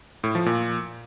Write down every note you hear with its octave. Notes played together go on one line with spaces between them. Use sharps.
A2
F3
A#2